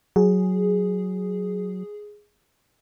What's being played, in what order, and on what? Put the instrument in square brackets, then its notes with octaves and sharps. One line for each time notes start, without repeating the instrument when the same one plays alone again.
[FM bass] F#3 [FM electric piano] G#4